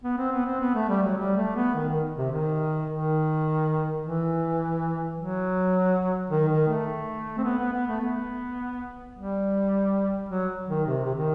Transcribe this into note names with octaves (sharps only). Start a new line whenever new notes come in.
B3
C4
B3
C4
B3
A3
G3
F#3
G3
A3
B3
D#3
D#3
C3
D#3
D#3
E3
F#3
D#3
D#3
A3
C4
B3
B3
B3
A3
B3
G3
F#3
D#3
C3
C3
D#3